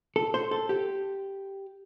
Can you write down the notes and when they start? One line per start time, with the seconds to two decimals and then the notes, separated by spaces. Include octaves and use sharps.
0.16 A4
0.34 C5
0.51 A4
0.69 G4